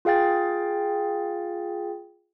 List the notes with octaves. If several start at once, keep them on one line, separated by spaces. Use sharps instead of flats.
F4 G#4 F5 G5 A6